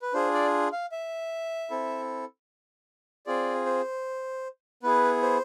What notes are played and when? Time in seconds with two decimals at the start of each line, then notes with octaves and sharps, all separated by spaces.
0.02 B4
0.13 D4 F4 G#4 C5
0.33 D5
0.72 F5
0.92 E5
1.70 C4 E4 A4
3.26 C4 F4 G#4 D5
3.66 C5
4.83 B3 E4 G#4 B4
5.22 C5